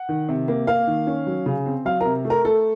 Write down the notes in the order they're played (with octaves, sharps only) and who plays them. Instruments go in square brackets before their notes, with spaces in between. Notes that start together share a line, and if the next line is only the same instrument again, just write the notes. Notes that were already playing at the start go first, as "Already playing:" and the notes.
Already playing: [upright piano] F#5
D#3
C3
A#3
A#3 F5
D#3
C#4
F#3
C#3
C4
F#3 F5
C3 A#4
A3
A#4
A3 A4